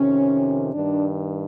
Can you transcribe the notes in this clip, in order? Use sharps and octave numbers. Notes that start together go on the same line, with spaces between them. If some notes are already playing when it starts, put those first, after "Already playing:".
Already playing: F2 C3 D#3 C#4
G2 D#3 D4